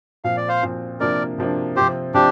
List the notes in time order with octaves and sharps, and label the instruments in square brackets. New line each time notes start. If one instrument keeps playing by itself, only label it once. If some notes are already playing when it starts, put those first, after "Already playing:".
[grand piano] A#2 F3 C4 [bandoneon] F5
[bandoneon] D5
C5 F5
[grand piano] A#2 F3 C4
[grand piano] C3 F3 A#3 D4 [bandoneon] A#4 D5
[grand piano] C3 F3 A#3 D4
[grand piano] C3 F3 C4 [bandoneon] G4 C5
[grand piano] C3 F3 [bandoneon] D4 G4